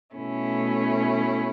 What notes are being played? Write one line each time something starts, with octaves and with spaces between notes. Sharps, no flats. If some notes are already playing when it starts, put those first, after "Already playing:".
B2 A3 C#4 E4